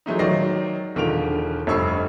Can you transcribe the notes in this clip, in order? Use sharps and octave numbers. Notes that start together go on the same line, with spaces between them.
F#3 G#3 A3 D#4
D#3 F#3 D5 D#5 A#6 C7
E1 D3 D#3 F4 D7 F7
F1 G2 C#6 E6 C7